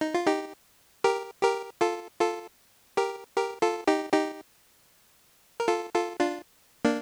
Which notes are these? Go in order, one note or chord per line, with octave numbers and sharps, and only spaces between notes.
D#4
F4
D#4 G4
G4 A#4
G4 A#4
F4 A4
F4 A4
G4 A#4
G4 A#4
F4 A4
D#4 G4
D#4 G4
A#4
F4 A4
F4 A4
D4 F4
A#3 D4